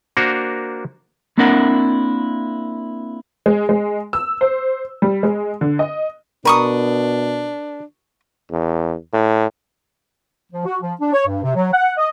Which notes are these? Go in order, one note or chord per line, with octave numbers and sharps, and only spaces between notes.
A#3 D4 F#4 A#4 C5
A#3 C4 D4 E4 A#4 F#5
G#3
G#3
E6
C5
G3
G#3
D3
D#5
B2 D4 A#4 B5 C#6 D#6
E2
A2
F3
F#4
F3
D4
C#5
G2
C3
F#3
F#5
D#5